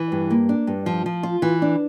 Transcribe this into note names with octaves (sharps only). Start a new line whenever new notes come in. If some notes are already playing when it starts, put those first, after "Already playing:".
Already playing: E3
G2
A#3
D4
G2
F3
F3
F4
E3
D4